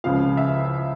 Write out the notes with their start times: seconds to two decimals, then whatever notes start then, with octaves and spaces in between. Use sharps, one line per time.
0.04 C#2 C#3 F3 F5
0.37 E5